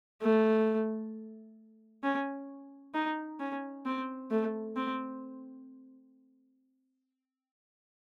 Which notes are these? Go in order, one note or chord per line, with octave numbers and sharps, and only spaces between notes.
A3
C#4
D#4
C#4
C4
A3
C4